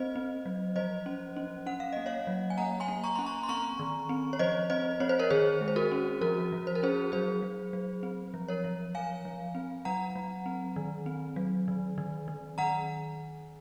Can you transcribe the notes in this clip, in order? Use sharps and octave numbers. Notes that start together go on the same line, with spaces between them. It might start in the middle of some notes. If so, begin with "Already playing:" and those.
Already playing: C4 C5 D#5
C4
F#3
F3 C5 D#5
C#4
C#4
C#4 F#5
F5
A#3 D#5
C#5 F5
F#3
G#5
A#3 F#5 A#5
G#5 C6
A#3
A#5 C#6
C#4 C6
A#5 C#6
C6
C4 A#5 C#6
D#3
C4
C#5
F3 C5 D#5
C4 C5 D#5
C4 C#5
C5
A#4 C#5
D#3 G#4 C5
G#3
C5
F#4 A#4
C#4
F3 F#4 A#4
F3
C5
A#4
C#4 G#4 C5
F#3 G#4 C5
F#3
F#3
C4
F3
A#4 C#5
F3
F3 F5 G#5
F3
C4
F#3 F#5 A#5
F#3
C4
D#3
C4
F#3
D#3
D#3
D#3
D#3 F#5 A#5